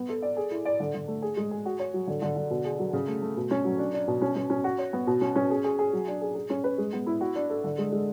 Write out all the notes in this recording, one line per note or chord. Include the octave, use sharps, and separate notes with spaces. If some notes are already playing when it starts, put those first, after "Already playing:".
Already playing: B3
A4
D5
G#4
E4
D5
D3
D3
A3
G#4
G#3
G#4
F#4
C#5
F#3
D3
D3
D3
B2
G#4
F#3
C#3
A3
A3
B2
C#4
F#3
D4
D4
B2
C#4
C#4
C#4
F#4
C#5
B3
B2
C#4
C#4
G#4
G#4
G#4
F#3
D4
G#4
G#4
C#4
B4
G#3
B3
E4
F#4
D4
A4
D3
G#3
G#3